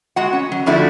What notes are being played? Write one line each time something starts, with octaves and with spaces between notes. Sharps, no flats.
G#3 F#4 F#5
C#4
F#3
D3 F3 A3 D4 E4 F#4